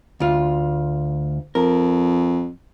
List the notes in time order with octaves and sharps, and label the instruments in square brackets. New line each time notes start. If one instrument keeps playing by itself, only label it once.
[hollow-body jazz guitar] D2 F4
[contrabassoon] F2 [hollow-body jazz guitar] A#4